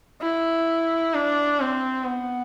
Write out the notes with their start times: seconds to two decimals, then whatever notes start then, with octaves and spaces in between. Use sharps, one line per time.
0.21 E4
1.14 D4
1.60 C4
2.07 B3